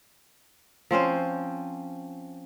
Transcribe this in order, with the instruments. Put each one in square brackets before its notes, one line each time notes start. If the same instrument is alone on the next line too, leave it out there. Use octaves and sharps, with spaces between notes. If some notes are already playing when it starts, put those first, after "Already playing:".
[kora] F3 C4 C#4 C5